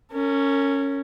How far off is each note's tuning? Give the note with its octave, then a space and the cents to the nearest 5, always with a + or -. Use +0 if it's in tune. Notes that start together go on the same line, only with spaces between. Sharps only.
C#4 +0 A#4 -35